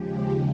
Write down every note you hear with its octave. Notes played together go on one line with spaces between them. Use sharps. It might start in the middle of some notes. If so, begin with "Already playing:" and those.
Already playing: D#2 C#3 F3 G#3 G4